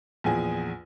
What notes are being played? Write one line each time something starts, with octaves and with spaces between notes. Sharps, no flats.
A#1 E2 G#4 G#5